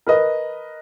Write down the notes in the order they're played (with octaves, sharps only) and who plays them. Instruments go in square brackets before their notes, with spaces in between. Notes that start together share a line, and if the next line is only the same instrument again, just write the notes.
[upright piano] A#4 B4 D#5